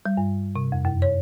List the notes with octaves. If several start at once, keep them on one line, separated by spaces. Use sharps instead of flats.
G3
G2
C3
F2
F#2
C#5